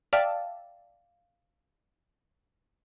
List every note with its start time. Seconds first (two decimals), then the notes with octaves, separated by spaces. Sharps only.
0.13 D5 E5 F5 G5 A5 F6